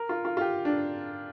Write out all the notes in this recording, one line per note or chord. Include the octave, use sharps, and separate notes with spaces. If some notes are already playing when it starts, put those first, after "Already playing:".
Already playing: A#4
F4
F4
F4
G4
D4